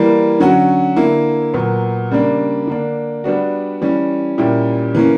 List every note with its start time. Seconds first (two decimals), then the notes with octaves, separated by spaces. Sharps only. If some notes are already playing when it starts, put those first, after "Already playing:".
Already playing: E3 G3 A#3
0.40 D3 F#3 C#4 F#4
0.96 D3 A#3 E4
1.54 A#2 F#3 B3
2.11 C#3 G3 A#3 D4
2.67 D3 A#3 D4
3.24 G3 B3 D4 F#4
3.81 E3 G3 C#4
4.38 A#2 G3 C#4 E4 G4
4.95 E3 A#3 C#4